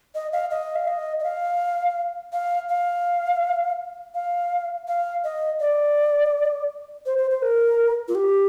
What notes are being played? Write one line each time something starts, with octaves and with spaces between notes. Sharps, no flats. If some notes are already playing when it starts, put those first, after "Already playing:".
D#5
F5
D#5
F5
D#5
D#5
F5
F5
F5
F5
F5
D#5
D5
C5
C5
C5
A#4
F4
G4